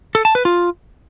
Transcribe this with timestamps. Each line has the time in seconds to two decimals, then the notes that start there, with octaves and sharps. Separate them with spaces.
0.15 A4
0.25 A5
0.35 B4
0.45 F4